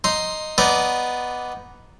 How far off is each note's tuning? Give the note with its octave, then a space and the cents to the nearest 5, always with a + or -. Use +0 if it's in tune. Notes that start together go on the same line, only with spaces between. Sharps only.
D#4 +0 C6 +0
B3 +0 D#4 +0 D5 -10